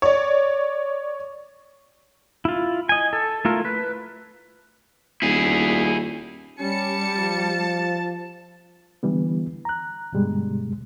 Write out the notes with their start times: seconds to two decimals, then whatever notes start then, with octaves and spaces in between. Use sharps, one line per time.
0.02 C#5 D5
2.45 E4 F4
2.89 D#5 G#5
3.13 A4
3.45 A3 E4 F4 A#4
3.65 B4
5.22 D#1 E4 G#4
6.60 G3 C#4 A5 C#7
7.17 F3
9.03 D3 E3 G3 B3
9.65 A#5 F#6
10.13 G2 B2 D3 G3 G#3